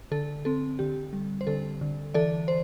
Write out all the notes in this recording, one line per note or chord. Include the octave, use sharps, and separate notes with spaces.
D3 A4
C4 A4
D3 G4
G3
C5
D3 A4
D3
E3 A4 D5
C5